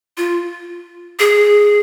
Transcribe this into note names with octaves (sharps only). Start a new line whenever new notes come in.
F4
G#4